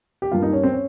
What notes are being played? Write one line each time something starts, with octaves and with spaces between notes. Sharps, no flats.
G4
G2 G3 A#3 F4
D#4
C#4
C4
C#4